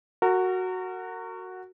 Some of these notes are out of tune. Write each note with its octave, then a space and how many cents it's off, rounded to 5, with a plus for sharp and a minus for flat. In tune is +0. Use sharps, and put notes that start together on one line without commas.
F#4 +0 A#4 -35